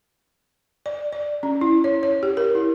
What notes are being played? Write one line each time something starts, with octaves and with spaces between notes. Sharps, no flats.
D5
D5
C#4
E4
C#5
C#5
G4
A#4
E4